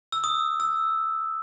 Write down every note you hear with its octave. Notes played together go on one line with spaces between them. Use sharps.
E6
D#6
E6